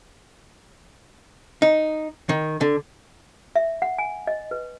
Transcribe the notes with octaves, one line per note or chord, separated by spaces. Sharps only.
D#4
D#3
D3
E5
F#5
G#5
D#5
B4